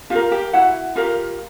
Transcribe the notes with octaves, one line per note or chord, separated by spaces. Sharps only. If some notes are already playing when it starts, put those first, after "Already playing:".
F4 G4 A#4 F5
G4 G5
E4 F#4 F#5
F4 G4 A#4 F5